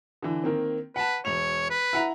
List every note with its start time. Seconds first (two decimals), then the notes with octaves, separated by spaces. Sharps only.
0.22 D3 E3
0.44 D#3 A#3 C4
0.96 B4 F#5 A5
1.25 E1 C#5 F7
1.70 B4
1.93 E4 F#5 A#5